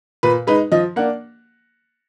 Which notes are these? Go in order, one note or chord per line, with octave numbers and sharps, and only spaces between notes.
A#2 B4
G#3 D#4 B4
F3 D#5
A#3 D4 F#5